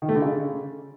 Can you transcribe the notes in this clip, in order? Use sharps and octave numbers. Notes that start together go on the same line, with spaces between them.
D#3
A3
D3
C#3